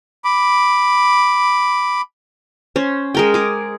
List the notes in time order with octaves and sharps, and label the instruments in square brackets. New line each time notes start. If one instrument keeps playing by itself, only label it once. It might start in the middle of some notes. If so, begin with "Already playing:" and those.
[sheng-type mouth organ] B5 D6
[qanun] C#4 C5
G#3 A#4 G5
G#4 D6